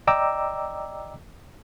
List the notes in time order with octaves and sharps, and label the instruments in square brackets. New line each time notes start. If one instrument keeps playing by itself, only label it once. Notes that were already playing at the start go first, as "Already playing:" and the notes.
[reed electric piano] D5 D#5 G5 A#5 D6 E6